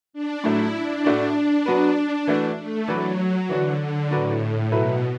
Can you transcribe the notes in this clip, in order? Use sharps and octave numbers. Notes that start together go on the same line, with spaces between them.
D4
A2 F#3 A3 E4
D4
A2 A3 F#4 D5
F#3 B3 F#4 B4
E3 A3 F#4
A3
E3 F#3 D4 F#4 B4 D5
D3 E3 D4 F#4
D3
A2 F#3 D4 F#4 B4 D5
B2 F#3 A3 E4 B4